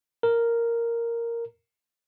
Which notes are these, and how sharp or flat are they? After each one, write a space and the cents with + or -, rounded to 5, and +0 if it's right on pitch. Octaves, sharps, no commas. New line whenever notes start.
A#4 -5